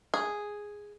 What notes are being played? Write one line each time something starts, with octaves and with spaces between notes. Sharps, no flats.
G#4